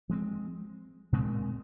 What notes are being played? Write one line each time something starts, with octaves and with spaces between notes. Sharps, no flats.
F3 G#3 C4
A#2 G#3 C4